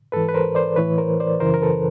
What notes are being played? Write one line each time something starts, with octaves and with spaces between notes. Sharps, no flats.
G#2 E3 A4 B4
B4
A#4 C5
C5 D5
A2 E3 B4 C#5
A#4 C5
C5 D5
F#2 C#3 E3 A#4 C5
A#4
A4 B4